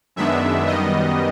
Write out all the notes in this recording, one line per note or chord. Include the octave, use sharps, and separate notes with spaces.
F#2 D#3 G#3 B3 D4 E5
F#2 D#3 G3 B3 D#5